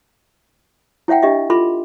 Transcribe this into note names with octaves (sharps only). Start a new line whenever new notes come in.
E4 C#5 E5 F#5 G5
D4 G4 D#5 E5
F4 A4 B5 C6